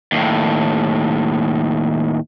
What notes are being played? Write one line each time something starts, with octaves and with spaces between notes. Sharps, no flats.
D#2 A2